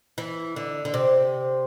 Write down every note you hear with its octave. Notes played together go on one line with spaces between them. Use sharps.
E3
D3
D3
C3